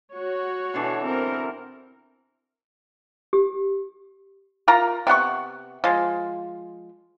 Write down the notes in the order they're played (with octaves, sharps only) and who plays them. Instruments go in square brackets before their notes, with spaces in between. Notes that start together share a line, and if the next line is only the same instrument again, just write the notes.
[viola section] F#4 C#5
[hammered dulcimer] B2 D3 E3
[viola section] C4 A#4
[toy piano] G4
[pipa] F4 A#4 A#5
C3 B3 F#5 C#6
F3 G#3